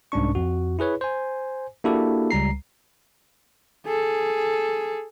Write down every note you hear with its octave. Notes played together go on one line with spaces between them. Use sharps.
C2 G#2 C#4 D4 C#6
F2 F#4
E4 G#4 B4 C#5
C5 G#5
A#3 D4 E4 F#4 G4 A4
C#2 G3 A#5 C7
G#4 A4